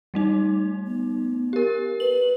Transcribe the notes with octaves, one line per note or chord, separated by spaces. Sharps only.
G3 A3 D#4
B3
G4 A#4
B4 F#7